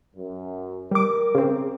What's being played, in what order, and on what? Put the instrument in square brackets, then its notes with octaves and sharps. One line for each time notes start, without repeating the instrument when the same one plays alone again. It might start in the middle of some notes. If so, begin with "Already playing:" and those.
[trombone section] F#2
[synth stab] G3 D6 [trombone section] A#4
[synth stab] C#3 C4